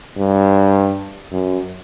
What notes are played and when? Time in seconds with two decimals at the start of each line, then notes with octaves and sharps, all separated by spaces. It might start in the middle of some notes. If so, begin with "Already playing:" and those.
0.17 G2
1.32 F#2